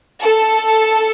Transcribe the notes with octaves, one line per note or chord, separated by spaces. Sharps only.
A4